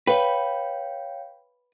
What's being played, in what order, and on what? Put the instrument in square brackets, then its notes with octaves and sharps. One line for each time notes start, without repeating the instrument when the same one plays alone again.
[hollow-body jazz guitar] B4 [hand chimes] C#5 F5 G5